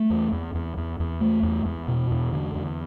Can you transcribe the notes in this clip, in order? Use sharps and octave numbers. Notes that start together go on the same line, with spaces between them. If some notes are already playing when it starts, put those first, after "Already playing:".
Already playing: A3
E2
E2
E2
E2
E2
A3
E2
E2
B2
E2
D3
E2